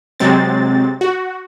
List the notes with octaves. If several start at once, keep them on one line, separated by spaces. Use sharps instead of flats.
C3 F#3 G#3 C4 A6
F#4